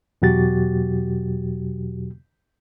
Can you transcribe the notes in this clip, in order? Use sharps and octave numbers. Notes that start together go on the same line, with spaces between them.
E2 B2 F#3 F#4 G4 A6